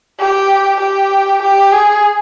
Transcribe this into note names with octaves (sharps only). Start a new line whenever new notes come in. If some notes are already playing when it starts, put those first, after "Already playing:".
G4
G4
G4
G#4